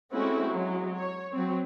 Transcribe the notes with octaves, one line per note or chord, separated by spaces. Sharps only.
G#3 A3 C4 C#4 E4 F#4
F#3 G#3
C#5
F#3 C4